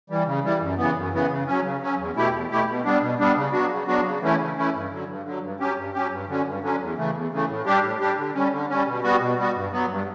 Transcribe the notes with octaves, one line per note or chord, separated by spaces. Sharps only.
E3 G3
C#3
E3 G3
F#2
C#3 E3 B3
F#2
C#3 E3 B3
C#3
F#3 C#4
C#3
F#3 C#4
E2
B2 A3 E4 G4
E2
B2 A3 E4 G4
B2
G3 B3 D4
B2
G3 B3 D4
C#3
F#3 B3 D4 F#4
C#3
F#3 B3 D4 F#4
C#3
E3 A3 C#4 E4
C#3
E3 A3 C#4 E4
G2
D3 F#3
G2
D3 F#3
G2
F#3 C#4 G4
G2
F#3 C#4 G4
G2
D3 F#3 C#4
G2
D3 F#3 C#4
E2
C#3 E3 A3
E2
C#3 E3 A3
A2
G3 D4 G4
A2
G3 D4 G4
D3
G3 C#4
D3
G3 C#4
B2
G3 B3 F#4
B2
G3 B3 F#4
G2
F#3 B3
G2